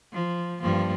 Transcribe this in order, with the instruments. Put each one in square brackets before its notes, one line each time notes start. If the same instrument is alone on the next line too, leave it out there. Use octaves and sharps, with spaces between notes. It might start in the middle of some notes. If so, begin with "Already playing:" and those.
[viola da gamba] F3
G2 F3 A#3